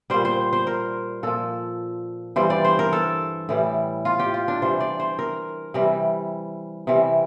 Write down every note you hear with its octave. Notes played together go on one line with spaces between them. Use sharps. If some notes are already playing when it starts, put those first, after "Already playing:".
A#2 G3 C5
C5
C5
A#4
A#2 F3 A4
G2 E3 G3 C5
D5
C5
A#4
A4
A2 E3 G3
F4
G4
F4
D4
C3 E3 G3 C5
D5
C5
A#4
C3 E3 G3
C3 E3 G3